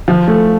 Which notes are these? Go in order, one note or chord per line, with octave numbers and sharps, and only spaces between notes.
F3
A3